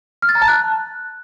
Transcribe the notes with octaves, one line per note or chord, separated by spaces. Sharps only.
F6
A6
A#5
A5
F#6